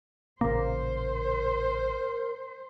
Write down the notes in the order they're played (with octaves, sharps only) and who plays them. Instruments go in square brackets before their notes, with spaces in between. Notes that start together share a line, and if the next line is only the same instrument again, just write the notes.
[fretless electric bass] A1 A#2 C#3 [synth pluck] A#3 [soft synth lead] A#4 [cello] C5